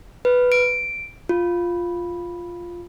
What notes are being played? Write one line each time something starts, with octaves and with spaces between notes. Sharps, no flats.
B4
D7
F4